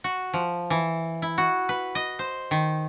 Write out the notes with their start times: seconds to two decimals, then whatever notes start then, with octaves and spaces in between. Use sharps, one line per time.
0.04 F#4
0.34 F3
0.70 E3
1.22 E4
1.38 F#4
1.69 B4
1.95 D#5
2.19 C5
2.51 D#3